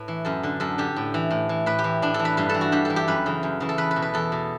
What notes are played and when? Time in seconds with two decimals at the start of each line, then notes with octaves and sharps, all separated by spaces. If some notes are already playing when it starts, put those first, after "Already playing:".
Already playing: A2 B4
0.08 E3
0.25 F#2 A4
0.43 D3
0.60 F#2 A4
0.78 D3 G4
0.96 A2
1.14 E3
1.31 A2
1.49 E3
1.66 A2 B4
1.79 G4
1.84 E3
2.02 A2 D4
2.14 A4
2.19 E3
2.25 B4
2.37 G2 B4
2.49 E3 A4
2.61 F#4
2.72 G2 G4
2.85 E3 A4
2.96 G4
3.08 F#2 B4
3.26 C#3 E3
3.43 F#2
3.60 C#3 E3
3.69 A4
3.78 E2 B4
3.91 B4
3.96 B2
4.02 B4
4.14 E2 A4
4.32 B2